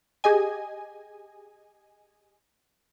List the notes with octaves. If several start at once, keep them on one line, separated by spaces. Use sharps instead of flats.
G4 G#4 D#5 G#5